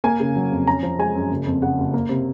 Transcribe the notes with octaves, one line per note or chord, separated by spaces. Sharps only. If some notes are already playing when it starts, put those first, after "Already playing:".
A#3 G#5
C#3
F#3
F2
C#4 A#5
F3
G#3 G#5
F#2
F#1
F2
C#3 F#5
F#1
A#3
C3